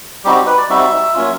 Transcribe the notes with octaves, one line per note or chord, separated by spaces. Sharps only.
G3 C4 D#4 F#4 G4
G4
B4
D5
G3 C4 D#4 F#4 E5
F#3 A#3 C#4 F4